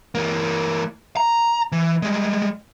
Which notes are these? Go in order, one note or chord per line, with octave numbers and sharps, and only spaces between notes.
E3 A#3
A#5
E3
G3 G#3